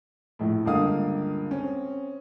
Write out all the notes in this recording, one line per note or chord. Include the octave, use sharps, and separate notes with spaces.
A#1 A2
C#2 G2 D3 A#3 F5 D#6
C4 C#4